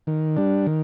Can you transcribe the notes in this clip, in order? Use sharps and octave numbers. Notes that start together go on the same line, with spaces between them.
D#3
G3 D4
D#3